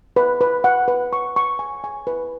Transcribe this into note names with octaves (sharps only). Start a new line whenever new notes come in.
B4
B4
F#5
B4
C#6
C#6
G#5
G#5
B4